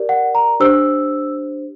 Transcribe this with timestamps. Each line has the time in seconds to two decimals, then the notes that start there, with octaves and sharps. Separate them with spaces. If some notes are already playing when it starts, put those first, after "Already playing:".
Already playing: G4 A#4 D5
0.09 F#5
0.35 A#5
0.60 D4 G4 C5 E6